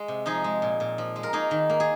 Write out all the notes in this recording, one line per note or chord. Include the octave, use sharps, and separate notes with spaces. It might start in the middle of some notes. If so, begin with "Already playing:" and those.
Already playing: G#3
C3
F3 D#4 G#4
G#3
A#2
A#2
F3
G#3
A#4
A#3 D#4 G#4
D#3
A#3
G#4